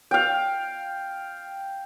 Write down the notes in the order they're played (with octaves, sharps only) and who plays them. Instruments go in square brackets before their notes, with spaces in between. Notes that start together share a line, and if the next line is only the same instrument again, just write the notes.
[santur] F5 G5